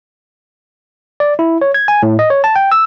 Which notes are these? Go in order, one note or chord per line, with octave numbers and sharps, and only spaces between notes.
D5
E4
C#5
G#6
G#5
A2
D#5
C#5
A5
G5
E6